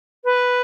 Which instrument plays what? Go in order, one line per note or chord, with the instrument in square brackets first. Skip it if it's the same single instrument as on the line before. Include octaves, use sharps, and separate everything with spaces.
[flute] B4